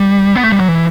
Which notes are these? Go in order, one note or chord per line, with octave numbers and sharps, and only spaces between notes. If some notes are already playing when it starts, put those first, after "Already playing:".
Already playing: G3
B3
A3
G3
F#3
E3